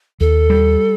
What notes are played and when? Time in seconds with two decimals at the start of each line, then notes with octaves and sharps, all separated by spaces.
0.20 D#2 A4
0.50 G3